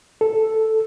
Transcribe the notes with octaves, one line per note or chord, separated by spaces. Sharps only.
A4